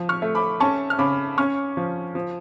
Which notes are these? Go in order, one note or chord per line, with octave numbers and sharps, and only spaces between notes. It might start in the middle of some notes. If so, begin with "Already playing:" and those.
Already playing: F3
C#6 F6
A3
B5 D6
C#4 A5 C#6
F6
C#3 B5 D6
C#4 C#6 F6
F3
F3